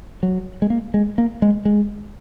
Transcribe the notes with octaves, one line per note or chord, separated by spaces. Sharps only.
F#3
G#3
A#3
G#3
A#3
G#3
G#3